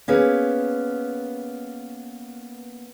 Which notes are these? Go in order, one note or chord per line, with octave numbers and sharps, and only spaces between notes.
A#3 B3 C#4 G#4 B4